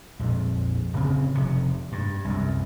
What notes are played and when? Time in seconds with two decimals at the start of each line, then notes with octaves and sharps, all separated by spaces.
0.19 A#1 F2
0.93 D1 C#3 C4
1.35 F1 C3
1.92 G2
2.25 C2 F#2